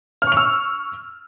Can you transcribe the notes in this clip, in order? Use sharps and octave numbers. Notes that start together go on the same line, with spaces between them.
C#6 E6 F6 F7